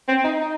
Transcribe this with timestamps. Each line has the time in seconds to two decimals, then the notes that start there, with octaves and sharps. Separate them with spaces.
0.08 C4
0.24 D#4
0.40 D#4